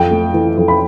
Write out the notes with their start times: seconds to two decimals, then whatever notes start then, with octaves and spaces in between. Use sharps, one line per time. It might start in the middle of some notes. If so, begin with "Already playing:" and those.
Already playing: F2 G5
0.11 A3
0.34 E3
0.58 F2
0.68 B5